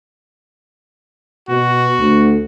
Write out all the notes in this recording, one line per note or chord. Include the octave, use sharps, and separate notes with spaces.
B2 F#4
D2